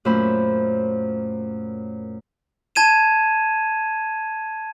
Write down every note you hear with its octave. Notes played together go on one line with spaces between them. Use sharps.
F#2 A#2 A3 C5 C#5 B5
A5 G#6 D#7 E7